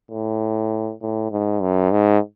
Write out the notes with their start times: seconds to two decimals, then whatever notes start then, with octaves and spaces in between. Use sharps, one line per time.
0.11 A2
1.02 A2
1.31 G#2
1.61 F#2
1.91 G#2